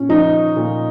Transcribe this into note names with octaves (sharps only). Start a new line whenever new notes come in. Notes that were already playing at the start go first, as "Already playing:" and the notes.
Already playing: A#2 C#4
F3 D#4
A#2